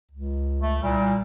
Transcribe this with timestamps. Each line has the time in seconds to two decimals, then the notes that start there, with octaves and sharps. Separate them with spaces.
0.12 C#2
0.61 A3
0.82 C2 A#2 G3